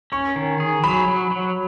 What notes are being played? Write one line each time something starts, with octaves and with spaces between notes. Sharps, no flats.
C#4 C#6
D#3
G#4
F#3 B5
F#3
F#3